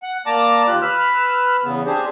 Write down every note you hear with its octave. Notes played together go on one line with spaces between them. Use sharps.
F#5
A#3 D5 A5 A#5 D6
D#2 F4 G4 F#6
B4 B5 E6 F6
E2 C#3 B3
C4 D4 G4 G#4 C5